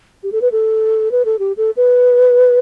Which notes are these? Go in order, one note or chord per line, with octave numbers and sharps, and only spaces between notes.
G4
A4
B4
A4
B4
A4
G4
A4
B4